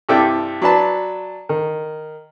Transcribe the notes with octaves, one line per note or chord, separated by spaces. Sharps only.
G2 C3 E4 A4 D5 G5
F#3 D4 B4 A5
D#3